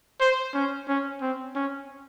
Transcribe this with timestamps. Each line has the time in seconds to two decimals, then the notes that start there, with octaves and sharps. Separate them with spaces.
0.21 C5
0.55 C#4
0.88 C#4
1.22 C4
1.56 C#4